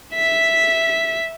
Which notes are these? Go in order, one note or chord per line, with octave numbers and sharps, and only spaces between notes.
E5 B6